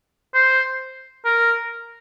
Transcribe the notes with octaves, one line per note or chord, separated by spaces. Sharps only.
C5
A#4